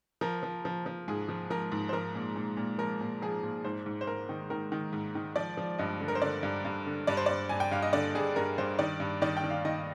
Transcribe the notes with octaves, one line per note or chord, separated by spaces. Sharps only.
F3 A#4
F3
F3
F3
G#2 G#4
F3
F3 A#4
G#2
C5
F3 A#4
A#2
A#2
A#2
F3 A#4
A#2
F3 G#4
A#2
G#2 C5
G#2
C5
G#2 A#4
D#3
D#3 A#4
D#3
G#2
D#3
F3 D5
F3
G2 D#5
D3
A#4
C5
D3 D5
G2
G2
D3
G2 D5
C5
G2 D5
G2 G#5
G5
G2 F5
D#5
D3 D5
G2 G#4
G2 A#4
G2 C5
D#3 D5
G2
D#3 D5
G5
D#3
F5
D#3 D#5